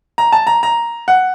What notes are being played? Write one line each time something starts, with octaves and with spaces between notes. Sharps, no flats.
A#5
A5
A#5
A#5
F#5